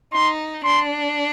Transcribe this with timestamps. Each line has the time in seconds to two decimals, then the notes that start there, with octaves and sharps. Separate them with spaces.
0.14 D#4 C6
0.65 D4 C6